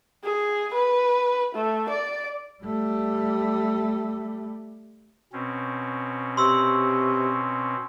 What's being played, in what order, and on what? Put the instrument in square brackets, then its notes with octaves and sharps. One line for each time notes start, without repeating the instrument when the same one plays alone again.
[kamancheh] G#4
B4
A3
D5
[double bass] G3 A3
[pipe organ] B2 C4 C#4
[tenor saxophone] C3 [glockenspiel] C6 C#6 E6